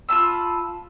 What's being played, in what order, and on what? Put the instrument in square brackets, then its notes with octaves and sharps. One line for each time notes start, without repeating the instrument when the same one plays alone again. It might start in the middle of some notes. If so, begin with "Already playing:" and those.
[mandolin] F4 A5 B5 E6